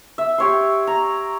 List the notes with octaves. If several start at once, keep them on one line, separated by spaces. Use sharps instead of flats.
E5
G4 C#5 C6
A#5